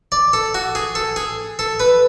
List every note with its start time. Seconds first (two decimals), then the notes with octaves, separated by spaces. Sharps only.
0.12 D5
0.33 A4
0.54 F#4
0.75 G#4
0.95 A4
1.16 G#4
1.59 A4
1.80 B4